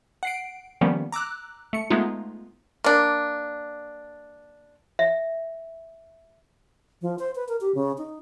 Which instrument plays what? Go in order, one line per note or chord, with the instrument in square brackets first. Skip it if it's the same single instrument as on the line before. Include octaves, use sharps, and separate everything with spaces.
[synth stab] F#5 C7 D7
D#3 F3 G3 A#3 B3 C#4
A#5 D6 E6 F#6
A3 C#7
G#3 A3 B3 D#4 F4
[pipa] A#3 D4
[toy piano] E5
[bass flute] F3
C5
B4
A#4
G4
C#3
D#4